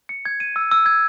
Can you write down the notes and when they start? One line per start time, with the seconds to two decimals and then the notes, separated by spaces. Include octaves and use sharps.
0.09 C#7
0.25 G#6
0.40 D#7
0.56 E6
0.71 E6
0.86 G#6